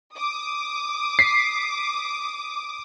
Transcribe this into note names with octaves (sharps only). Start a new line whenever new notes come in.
D6 D#6
B6 C7